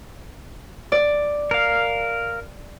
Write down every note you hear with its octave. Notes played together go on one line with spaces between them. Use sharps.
D5
A#4 F5